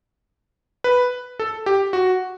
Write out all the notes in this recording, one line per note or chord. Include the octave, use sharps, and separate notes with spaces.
B4
A4
G4
F#4